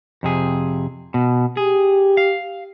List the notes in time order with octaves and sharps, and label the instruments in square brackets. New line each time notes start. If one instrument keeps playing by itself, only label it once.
[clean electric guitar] F2 C3 G#4
B2
[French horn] G4 [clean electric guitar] G#4
[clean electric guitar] F5